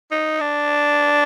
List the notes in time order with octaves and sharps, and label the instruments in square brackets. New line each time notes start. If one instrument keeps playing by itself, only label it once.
[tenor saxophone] D#4
D4